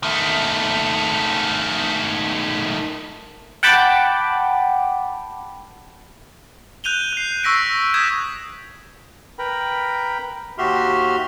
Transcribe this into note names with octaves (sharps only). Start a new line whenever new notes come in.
D#3 A3
F#5 G5 A5 B5 D6
F#6 G6 D#7 F7 G7
F#6 C7
C#6 E6 A#6 B6 D7
D#6 G6 G#6 B6 E7
A#4 B4 G5 A#5 B5
D#2 F#4 G4 E5 C6 F6